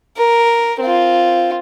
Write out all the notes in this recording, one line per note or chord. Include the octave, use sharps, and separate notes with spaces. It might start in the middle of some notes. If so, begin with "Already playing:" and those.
A#4
C4 F4